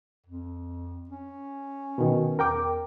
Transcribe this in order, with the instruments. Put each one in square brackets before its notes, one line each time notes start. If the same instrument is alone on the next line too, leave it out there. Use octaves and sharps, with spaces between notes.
[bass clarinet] F2
C#4
[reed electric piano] B2 D#3
[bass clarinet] E2 [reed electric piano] A#4 G5 D6